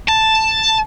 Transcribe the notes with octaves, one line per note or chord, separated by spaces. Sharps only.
A5